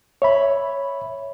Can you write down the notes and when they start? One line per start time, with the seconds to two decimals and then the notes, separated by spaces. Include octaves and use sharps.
0.22 C#5 E5 B5